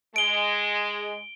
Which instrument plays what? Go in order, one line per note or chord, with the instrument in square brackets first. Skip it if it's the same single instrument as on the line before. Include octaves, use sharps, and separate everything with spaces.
[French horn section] G#3 [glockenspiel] D7 G7